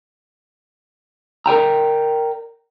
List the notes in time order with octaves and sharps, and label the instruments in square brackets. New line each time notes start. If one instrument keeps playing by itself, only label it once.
[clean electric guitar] A#4 D5 G5 A#5